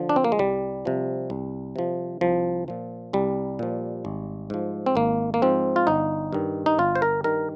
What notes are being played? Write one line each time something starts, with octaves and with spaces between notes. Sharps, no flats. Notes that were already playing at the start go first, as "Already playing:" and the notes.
Already playing: D3 F3
D4
C4
A#3
G#3
C2 G3
C3 F3
C2
C3 F3
C2 F3
A#2 F3
C2 G3
A#2 F3
G#1
G#2 F3
C4
G#1 A#3
A#3
G#2 F3 C4
F4
G1 D#4
G2 D#3
D#4
G1 F4
C5
A#4
G2 D#3 A#4